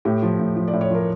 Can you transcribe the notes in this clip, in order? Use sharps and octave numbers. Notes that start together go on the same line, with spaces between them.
A2 G4
F3
A2
F3
D5
A2
C#5
F3 A#4